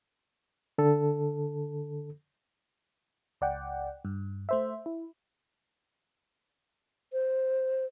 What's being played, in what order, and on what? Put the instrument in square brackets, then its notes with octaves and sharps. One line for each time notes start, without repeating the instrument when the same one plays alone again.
[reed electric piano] D3 A4
[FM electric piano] C#2 D5 F#5 G5
G2
A3 C5 E5
E4
[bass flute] C5